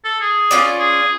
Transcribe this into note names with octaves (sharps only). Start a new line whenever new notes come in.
A4
G#4
C#4 F4 D5
G#4